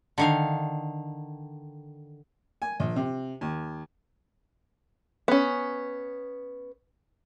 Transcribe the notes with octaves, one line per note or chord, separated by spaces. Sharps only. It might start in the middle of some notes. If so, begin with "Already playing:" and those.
D3 D#3 F5
G#5
A#1
C3
D#2
B3 C#4